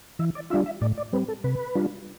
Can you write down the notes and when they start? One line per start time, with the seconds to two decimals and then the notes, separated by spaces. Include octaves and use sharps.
0.19 E3 E5
0.35 D5
0.50 G3 D4 F4 E5
0.66 E5
0.81 A2 D5
0.97 D5
1.13 G3 C4 B4
1.28 A4
1.44 C3 B4
1.75 G3 D4 F4